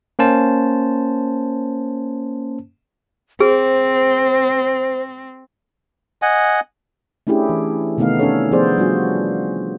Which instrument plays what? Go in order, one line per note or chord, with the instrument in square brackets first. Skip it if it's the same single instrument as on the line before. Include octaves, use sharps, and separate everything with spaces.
[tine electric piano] A#3 C#4 C5 A5
[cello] C4 [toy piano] G#4 [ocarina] C5
[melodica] D#5 F#5 G#5
[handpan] A3 C#4 D4 E4 G4 G#4
E3
C3 D#3 A3 B3 D#4 F5
C#4 D4 A4 C#5
F3 B3 G#4 C5 D5
G3 D4 F4 F#4